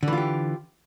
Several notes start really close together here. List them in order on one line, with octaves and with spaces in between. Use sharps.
D3 E3 F4 G4